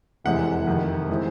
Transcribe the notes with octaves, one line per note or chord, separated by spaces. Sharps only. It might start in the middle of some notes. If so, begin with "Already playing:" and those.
F1 E2 C3 E3 G#3 F#5
F2 C3 D#3
E3 G#3 C4